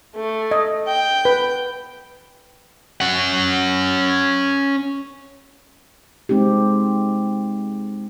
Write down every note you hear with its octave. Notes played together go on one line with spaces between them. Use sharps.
A3
D#5
G5
B4
C#4 F#5
G#3 C4 D#4 G4